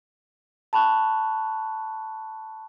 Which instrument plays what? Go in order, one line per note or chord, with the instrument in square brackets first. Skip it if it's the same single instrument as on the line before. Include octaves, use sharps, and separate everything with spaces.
[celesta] A5 B5 C#6 F#6